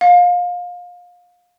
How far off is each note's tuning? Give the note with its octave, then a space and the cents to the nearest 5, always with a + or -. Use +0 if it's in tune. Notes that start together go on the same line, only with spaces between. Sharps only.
F5 +25